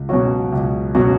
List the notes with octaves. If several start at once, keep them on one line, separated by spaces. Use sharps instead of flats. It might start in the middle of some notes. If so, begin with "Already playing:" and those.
Already playing: C#2
B2 F#3 C#4 F#4
C#2
B2 F#3 C#4 F#4